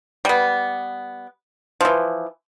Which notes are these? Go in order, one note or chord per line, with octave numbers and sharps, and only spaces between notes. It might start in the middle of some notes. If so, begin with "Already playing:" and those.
G3 B3
E3 F3